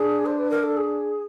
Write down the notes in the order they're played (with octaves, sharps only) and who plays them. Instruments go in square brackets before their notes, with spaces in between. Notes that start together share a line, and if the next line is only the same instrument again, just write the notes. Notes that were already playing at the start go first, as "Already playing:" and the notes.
Already playing: [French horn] D4 [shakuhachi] G#4
[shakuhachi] C5
B4
A#4
A4
G#4